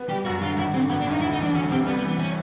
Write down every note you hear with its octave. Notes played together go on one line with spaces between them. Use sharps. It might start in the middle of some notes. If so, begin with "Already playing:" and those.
Already playing: B3
G3 G4
F#2 F#4
D3 F4
G#1 E4
D3 C4
G#1 B3
D4
G2
D#4
D2 E4
D#4
E3
D4
D2 C#4
C3 C4
G3 B3
B3
E3
B3
C#4